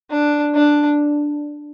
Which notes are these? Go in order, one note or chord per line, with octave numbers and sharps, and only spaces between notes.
D4
D4